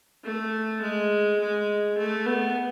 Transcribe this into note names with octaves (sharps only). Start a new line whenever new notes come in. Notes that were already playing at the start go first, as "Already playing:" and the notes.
A3
G#3
G#3
A3
B3